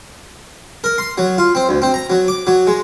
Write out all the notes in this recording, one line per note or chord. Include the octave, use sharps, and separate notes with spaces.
A#4
C6
F#3
F4
C4
D2
C4
A#5
F#3
D6
F#3
G#3